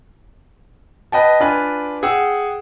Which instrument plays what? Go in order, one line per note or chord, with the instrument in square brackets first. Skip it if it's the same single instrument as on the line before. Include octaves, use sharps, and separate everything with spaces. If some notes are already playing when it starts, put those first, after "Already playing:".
[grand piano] B4 D#5 G5 A5
D4 F4 B4 G#5
G#4 F#5 G5 E6